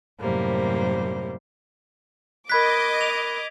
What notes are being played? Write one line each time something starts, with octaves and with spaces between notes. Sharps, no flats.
F#2 A2 C3 G3 A#3 C5
A#4 D#5 B5 D6 F#6 G#6 B6
F7